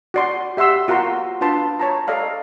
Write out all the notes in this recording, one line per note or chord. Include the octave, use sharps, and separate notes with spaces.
F#4 D5 C6
G4 E5 F#5 C6 E6
F4 F#4 A#4 A#5 C6
D4 F4 B4 A5 C6
C#5 A5 A#5
A4 D5 D#5 F5 A#5